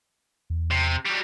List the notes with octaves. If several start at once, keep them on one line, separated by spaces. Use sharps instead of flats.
E2
C3
F#3 G3